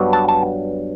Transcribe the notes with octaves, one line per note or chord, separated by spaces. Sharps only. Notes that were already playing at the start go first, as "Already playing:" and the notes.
Already playing: G2 F#3 B3 D4
A5
A5